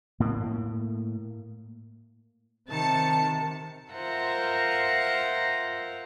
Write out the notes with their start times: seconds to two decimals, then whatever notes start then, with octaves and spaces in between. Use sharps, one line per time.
0.20 A2 A#3
2.69 C3 D#3 A5 C#7
3.93 F4 A#4 C5 E5 F#5